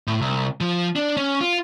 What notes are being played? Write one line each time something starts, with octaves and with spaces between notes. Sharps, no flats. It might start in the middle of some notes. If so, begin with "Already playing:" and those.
A2
C2
F3
D4
C#4
F4